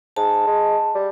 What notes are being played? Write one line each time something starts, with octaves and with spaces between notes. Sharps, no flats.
G#2 A5
G#3
G3